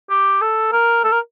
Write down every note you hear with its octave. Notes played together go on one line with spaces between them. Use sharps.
G4
A4
A#4
A4
A#4